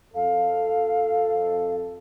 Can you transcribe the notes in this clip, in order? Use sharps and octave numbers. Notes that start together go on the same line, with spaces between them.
F2 A4 F5